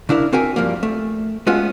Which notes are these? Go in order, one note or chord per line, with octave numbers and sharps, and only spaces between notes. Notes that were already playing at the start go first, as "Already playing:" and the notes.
C#3 D4 E4 A#4
C4 F#4 A#4 E5 G#5
G2 F3 G3 A#3
A3
G#3 A3 B3 C#4 F4 F#4